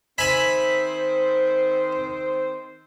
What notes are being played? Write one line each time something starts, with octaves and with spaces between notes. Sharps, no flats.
D#3 C4 C5 E5 G#5 B5